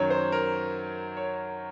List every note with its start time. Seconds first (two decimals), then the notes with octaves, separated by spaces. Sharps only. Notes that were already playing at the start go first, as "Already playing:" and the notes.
Already playing: F#2 D#3 F#3 C#5
0.10 C5
0.32 A#4
1.17 C#5